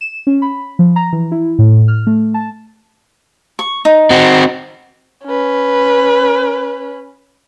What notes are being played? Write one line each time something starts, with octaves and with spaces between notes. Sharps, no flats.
E7
C#4
B5
F3
A#5
E3
E4
A2
F6
A3
A5
C#6
D#4
C4 F#4
C#4 B4